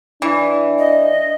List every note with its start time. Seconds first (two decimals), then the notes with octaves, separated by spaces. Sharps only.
0.22 E3 D4
0.78 D#5